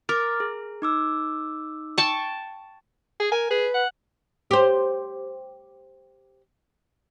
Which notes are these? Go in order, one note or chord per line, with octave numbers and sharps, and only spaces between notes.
A#4 D6 F6 A6
G#4
D#4 D6 E6
G5 A5 C#6
G#4
A#4 G#5
G#4 B4
F#5
G4 C5